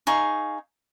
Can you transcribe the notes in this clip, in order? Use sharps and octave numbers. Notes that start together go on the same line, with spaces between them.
D#4 G#4 F5 C#6